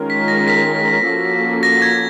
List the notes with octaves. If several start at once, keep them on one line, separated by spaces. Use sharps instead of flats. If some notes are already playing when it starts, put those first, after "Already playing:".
Already playing: D#3 G#3 C#4 F4 A#4
B6
A#6
B6
F3 A#3 C#4 F#4 A4
A#6
G#6